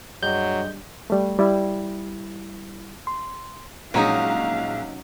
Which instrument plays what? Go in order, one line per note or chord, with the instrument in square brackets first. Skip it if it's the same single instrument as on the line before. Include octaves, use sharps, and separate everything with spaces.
[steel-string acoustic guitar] G2 [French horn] F#3 [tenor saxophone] G#3 [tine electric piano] G6
[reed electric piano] G3 A3
G3 E4
C6
[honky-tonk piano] A#1 G#3 A#5 [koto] F#3 C#4 D#4 [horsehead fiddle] F5